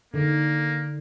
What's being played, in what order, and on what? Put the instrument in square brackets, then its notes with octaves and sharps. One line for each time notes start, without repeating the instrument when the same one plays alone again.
[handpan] D3 D#3 [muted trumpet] A#3